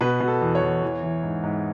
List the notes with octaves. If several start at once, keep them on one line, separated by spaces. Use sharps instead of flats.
B2 B4
B2
A4
E2
C#5
E2
E3
E3
G#2
G#2